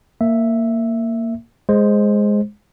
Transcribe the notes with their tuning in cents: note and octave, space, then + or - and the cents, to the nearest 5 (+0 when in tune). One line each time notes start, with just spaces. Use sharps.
A#3 -15 E5 +0
G#3 +0 C5 +5